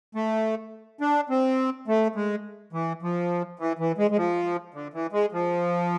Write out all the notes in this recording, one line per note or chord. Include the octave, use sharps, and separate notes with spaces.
A3
D4
C4
A3
G#3
E3
F3
E3
E3
G#3
G#3
F3
D3
E3
G#3
F3